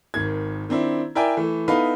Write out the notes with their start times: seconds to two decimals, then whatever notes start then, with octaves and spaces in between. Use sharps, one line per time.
0.14 G#1 D#3 G#6
0.69 D#3 C4 D4 E4
1.15 E4 A#4 D5 E5 G5 G#5
1.37 E3 A3
1.68 B3 D#4 E4 A4 B4 F5